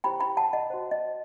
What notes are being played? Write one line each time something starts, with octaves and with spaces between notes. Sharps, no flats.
E4 G4 C5 G5 B5
G5 B5
F#5 A5
D#5 F#5
F#4 C5
D#5